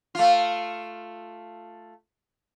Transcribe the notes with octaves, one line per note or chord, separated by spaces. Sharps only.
A3 F4